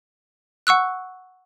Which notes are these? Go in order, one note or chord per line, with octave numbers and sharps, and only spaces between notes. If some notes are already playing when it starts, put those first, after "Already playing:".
F#5 C#6 E6 F#6